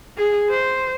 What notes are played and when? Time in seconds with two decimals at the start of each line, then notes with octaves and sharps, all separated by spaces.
0.18 G#4
0.50 C5